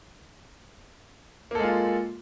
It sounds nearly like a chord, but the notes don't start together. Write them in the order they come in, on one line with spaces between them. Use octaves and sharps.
A#3 A4 G#3 F4